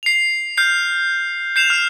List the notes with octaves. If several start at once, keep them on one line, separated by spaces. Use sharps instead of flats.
C7 F7
F6 G6 C7
G6 C7 E7 F7
F6